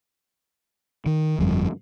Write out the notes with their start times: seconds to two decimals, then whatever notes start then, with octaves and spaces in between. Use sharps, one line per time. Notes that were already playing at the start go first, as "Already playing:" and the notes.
1.06 D#3
1.39 G1 F2 G3